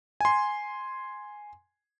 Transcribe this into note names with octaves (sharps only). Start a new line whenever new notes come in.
G#5 C6